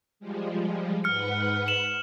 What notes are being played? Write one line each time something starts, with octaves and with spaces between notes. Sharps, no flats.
F3 G3 G#3
G#2 B4 F#5 F6 C#7
E7 F#7